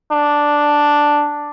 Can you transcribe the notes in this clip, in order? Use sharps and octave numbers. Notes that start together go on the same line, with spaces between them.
D4